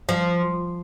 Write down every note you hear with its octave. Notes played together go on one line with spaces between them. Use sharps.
F3